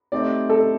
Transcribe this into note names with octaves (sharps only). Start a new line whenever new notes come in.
A3 C4 D#4 G4 D5
A4